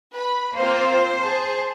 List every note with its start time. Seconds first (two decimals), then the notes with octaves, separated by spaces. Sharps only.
0.12 B4 B5
0.56 A#3 C4 F4 C5
1.23 G#4 A5